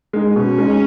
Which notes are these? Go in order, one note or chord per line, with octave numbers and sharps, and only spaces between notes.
G#3 D#4
B2 C#4
G#3 D#4